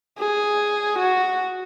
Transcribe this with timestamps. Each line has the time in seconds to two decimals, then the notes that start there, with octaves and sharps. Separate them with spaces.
0.19 G#4
0.98 F#4